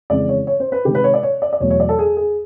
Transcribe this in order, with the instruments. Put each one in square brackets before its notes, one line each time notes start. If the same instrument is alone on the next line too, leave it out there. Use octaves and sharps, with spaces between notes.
[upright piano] F2 C#3 E3 G#3 D5
C#5
C#5
C5
B4
C3 D#3 G#3 G4
B4
C#5
D5
C#5
D5
D5
E2 B2 F#3 A3 C#5
C#5
D5
A4
G#4
G#4